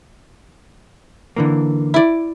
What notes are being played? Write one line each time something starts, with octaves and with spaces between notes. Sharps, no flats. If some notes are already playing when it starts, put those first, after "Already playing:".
D3 E3 A#3
E4 D5